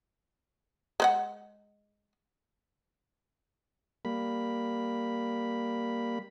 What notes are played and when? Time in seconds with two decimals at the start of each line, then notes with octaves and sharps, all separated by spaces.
1.00 G#3 B4 F#5
4.05 G3 A#3 B5